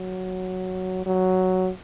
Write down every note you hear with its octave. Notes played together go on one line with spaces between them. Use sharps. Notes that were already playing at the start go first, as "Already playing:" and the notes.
Already playing: F#3
F#3